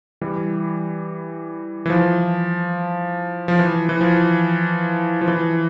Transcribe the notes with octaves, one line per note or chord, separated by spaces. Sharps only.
E3 G3
E3
F3
F3
E3
E3
F3
F3
E3